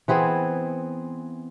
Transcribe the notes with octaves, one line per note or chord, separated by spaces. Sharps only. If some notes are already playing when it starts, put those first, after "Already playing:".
E3 B3 C4 G#4